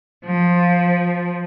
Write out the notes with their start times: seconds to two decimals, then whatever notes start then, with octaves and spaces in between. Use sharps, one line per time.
0.24 F3